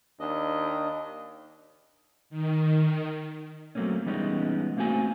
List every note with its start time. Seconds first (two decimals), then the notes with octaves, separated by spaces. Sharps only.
0.20 D#2 D4 D#5
2.30 D#3
3.75 F#3 A3 A#3 C4 C#4
4.06 E3 G3 G#3 B3 C#4 D#4
4.77 A3 A#3 C4 F#4 G#5